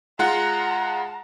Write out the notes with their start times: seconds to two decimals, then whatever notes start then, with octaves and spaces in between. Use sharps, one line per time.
0.19 G#3 F4 F#5 A#5